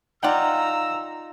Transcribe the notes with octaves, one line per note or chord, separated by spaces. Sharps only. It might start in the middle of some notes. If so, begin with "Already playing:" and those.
D#4 F4 D5 F#5 G5 A#5 E6